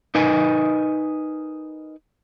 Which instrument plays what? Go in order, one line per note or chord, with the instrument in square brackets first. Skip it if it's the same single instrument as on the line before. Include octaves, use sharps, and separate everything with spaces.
[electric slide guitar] D#4 A#4 B4 D#5 G#5